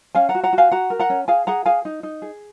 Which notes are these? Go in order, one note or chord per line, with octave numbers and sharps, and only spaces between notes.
C#4 F5 G#5
F#5 A#5
F#4
F#5 A#5
F#4
F5 G#5
F#4 F#5 A#5
A#4
F#5 A#5
C#4
G#4 F5 G#5
G#4 F#5 A#5
G#4 F5 G#5
D#4
D#4
G#4